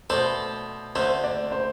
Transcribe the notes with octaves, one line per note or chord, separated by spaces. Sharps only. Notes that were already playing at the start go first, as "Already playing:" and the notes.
B2 A3 D4 A4 C5
D2 D3 A3 C5
D5
C5